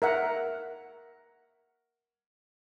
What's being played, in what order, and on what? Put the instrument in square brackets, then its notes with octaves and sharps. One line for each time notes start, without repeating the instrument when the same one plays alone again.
[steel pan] A#4 E5 F#5